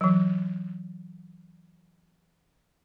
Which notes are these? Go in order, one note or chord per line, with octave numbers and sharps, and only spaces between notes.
E3 F#3